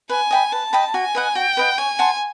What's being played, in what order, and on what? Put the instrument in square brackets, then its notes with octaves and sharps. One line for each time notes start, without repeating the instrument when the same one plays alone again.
[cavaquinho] B4 [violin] G#5
[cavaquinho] D#5 G5 B5
[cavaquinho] B4 [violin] A5
[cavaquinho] D#5 G5 B5
[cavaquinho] F#4 [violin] G#5
[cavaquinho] B4 D#5 F#5
[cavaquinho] F#4 [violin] G5
[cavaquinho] B4 D#5 F#5
[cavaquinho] C#5 [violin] G#5
[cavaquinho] F#5 A5 C6